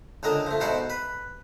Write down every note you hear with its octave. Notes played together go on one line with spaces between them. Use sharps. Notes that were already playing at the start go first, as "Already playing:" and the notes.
C#2 D3 A#4 D#5 A5
F3 A3
G#2 B2 F#4 C5 D5 A5
B4